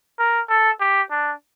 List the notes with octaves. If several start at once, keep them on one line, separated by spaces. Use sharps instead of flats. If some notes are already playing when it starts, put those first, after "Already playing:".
A#4
A4
G4
D4